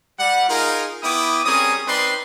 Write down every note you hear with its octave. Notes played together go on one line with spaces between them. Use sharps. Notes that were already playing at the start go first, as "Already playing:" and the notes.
G3 F#5
D#4 F4 G#4 A#4
B3 E4 G5 D6 D#6
G3 C4 C#4 G#4 A#4 D#6
C4 D#4 B4 D5 C6